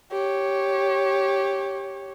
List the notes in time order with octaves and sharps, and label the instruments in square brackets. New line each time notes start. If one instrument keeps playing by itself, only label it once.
[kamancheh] G4 C#5